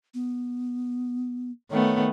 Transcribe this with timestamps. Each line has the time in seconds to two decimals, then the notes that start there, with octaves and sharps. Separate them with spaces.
0.14 B3
1.70 D#3 A3 B3 C#5